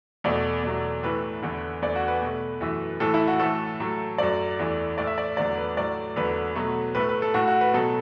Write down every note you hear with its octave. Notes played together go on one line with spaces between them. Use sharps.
E2 B2 A3 D5
E2 B2 F#3 A3
A2 E3 A3 B4
E2 D3 A3
E2 D3 A3 D5
F#4
B4
B2
A3
F#2 E3 A3
A2 E3 A3 A4
E4
F#4
A2 E3 A3 A4
A2 F#3 A3
F#2 F#3 A3 D5
E2 E3 A3
A2 A3 D5
E5
D5
E2 D3 F#3 A3 D5
B4
A2 F#3 A3 D5
E2 D3 F#3 A3 B4
B2 F#3 A3
A2 A3 B4
B4
A4
A2 A3 F#4
F#4
B4
B2 F#3 A3 A4